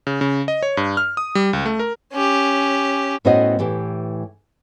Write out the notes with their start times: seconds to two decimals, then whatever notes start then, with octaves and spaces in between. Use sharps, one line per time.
0.07 C#3
0.21 C#3
0.48 D#5
0.63 C#5
0.77 G2
0.97 F6
1.17 D#6
1.35 G3
1.53 C#2
1.66 A3
1.79 A#4
2.12 C#4 G4
3.25 A2 B3 C#4 F#4 C5 D#5
3.59 A2 E3 G4